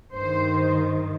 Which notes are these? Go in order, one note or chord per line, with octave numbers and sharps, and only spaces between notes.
G2 D#3 C5